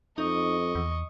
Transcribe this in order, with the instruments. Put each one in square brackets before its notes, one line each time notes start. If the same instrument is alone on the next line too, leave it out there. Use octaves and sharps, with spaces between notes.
[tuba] F2 [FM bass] D#4 [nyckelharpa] D#5 C#6
[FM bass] E2